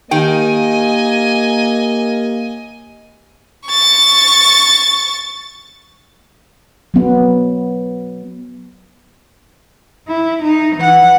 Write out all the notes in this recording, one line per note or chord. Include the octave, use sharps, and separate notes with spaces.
D#3 A#3 G4 D#5 G5 G#5
C#6 A6
F#3 B3
E4
D#4
E3 F#5